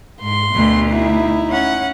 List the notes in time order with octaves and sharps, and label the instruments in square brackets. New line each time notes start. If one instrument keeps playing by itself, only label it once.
[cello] G#2 [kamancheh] C6
[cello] D2 B2
[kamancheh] D#4 E4
[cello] C#4 F#5